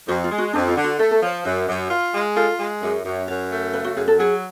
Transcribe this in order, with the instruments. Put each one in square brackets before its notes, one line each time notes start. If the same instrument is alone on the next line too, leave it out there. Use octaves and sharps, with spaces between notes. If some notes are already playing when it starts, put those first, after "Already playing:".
[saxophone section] F2 [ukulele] F#4
[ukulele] F4
[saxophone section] G#3
[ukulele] F#4
[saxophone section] F2 [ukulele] D4
[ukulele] F4
[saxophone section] D3
[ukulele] F#4
[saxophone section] A3 [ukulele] A4
[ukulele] A4
[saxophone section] F3 [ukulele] C#5
[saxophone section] F#2
F#2
F4
G#3
[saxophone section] F4 [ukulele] A4
[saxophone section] G#3
[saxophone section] F#2 [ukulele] G#4
[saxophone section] F#2
[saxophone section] F#2 [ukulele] C#5
[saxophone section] A3
[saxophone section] C#3 [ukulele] B4
[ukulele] F#4
[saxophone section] F#2 [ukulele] G#4
[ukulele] A4
[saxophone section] F#3 [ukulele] G#4